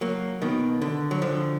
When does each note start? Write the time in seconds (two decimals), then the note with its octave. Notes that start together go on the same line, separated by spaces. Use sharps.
0.01 F#3 A#3
0.42 B2 D#3
0.82 D3
1.11 F#3
1.22 D3 F3